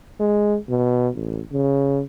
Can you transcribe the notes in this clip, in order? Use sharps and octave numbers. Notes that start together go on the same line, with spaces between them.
G#3
B2
A1
C#3